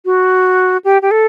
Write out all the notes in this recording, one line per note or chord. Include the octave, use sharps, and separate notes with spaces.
F#4
G4
G4
A4